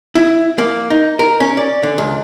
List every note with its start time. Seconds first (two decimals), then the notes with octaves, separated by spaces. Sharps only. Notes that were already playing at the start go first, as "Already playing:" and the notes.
0.15 E4
0.58 A#3
0.90 D#4
1.19 A#4
1.40 C#4
1.57 D5
1.83 D3
1.98 C#2